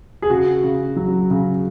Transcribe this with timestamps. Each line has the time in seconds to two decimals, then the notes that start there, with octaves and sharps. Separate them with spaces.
0.22 G#4
0.30 C#3 F#4
0.64 C#3
0.96 F#3
1.30 C#3